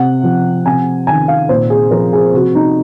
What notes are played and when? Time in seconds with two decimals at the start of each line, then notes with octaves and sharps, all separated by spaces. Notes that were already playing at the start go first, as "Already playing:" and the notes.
Already playing: C3 F#5
0.24 F3
0.66 C3 G#5
1.07 D#3 G#5
1.28 F5
1.49 A#2 C5
1.70 G#4
1.91 F3 A#4
2.13 G#4
2.34 C3 F#4
2.55 D#4